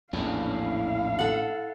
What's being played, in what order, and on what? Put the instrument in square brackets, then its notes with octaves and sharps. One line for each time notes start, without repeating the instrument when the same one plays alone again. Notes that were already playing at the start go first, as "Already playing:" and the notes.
[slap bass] A#1 E2 [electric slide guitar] A2 C#4 D4 [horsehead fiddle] E4 F5
[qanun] A4 F#5